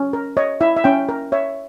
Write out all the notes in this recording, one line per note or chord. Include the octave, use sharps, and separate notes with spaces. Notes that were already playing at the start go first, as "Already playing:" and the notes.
Already playing: C#4
A#4
C#5 D#5
E4 E5
E5
C#4 G5
A#4
C#5 E5